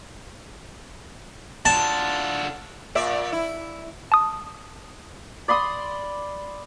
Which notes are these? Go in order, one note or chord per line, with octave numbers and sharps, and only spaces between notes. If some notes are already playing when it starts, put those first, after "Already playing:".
D3 F4 A5
A#2 D5 E5
E4
A5 D#6
D5 B5 C6 D#6